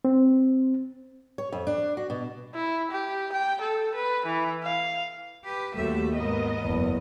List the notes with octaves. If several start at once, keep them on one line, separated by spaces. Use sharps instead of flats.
C4
C#5
F2
D4
F#4
B2
E4
G4
G5
A4
B4
E3
F5
G4 B4
D#2 G3 A3 F#4 G4 E5
G#2 B3 A#4 D#5
F#1 E2